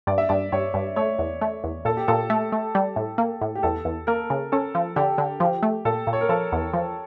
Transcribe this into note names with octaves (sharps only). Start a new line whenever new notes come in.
G2 D5
E5
G2 D5
G2 C#5
G2
A3 C#5
E2
A3
E2
A#2 A4
G4
A#2 A4
A3
A3
G3
A2
A#3
A2
G4
E2 A4
E2
A#3 A#4
C#3
C#4 A4
F3
D3 G4
D3
F3 G4
A3
A#2 A4
A#2
C#5
A#4
F3 A4
E2
F3